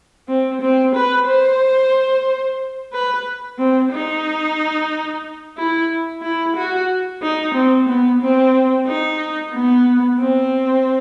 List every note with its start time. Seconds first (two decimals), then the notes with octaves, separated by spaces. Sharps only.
0.28 C4
0.61 C4
0.95 B4
1.27 C5
2.93 B4
3.58 C4
3.92 D#4
5.58 E4
6.22 E4
6.56 F#4
7.22 D#4
7.54 C4
7.88 B3
8.21 C4
8.87 D#4
9.53 B3
10.20 C4